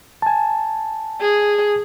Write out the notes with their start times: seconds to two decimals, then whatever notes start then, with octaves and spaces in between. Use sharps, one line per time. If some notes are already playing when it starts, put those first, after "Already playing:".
0.22 G#5 A5
1.21 G#4